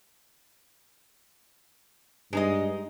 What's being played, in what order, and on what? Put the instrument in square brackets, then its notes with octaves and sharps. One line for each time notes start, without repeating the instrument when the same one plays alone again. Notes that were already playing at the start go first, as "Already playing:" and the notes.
[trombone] G2 [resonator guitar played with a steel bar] G#3 D#4 D#5